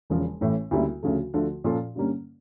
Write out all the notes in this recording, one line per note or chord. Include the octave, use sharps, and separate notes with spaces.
E1 E2 C#3 F3
A1 A2 E3
D2 C#3 G3 A#3 E4
D2 C#3 F3 A3
D2 D3 F3 A3
A#2 F3 C#4 F4 A4
G2 D3 G3 A#3 C#4